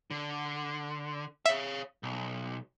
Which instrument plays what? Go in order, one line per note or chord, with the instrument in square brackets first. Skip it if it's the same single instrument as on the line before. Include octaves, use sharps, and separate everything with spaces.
[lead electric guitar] D3
[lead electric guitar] C#5 F5 [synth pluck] E5
[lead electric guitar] B1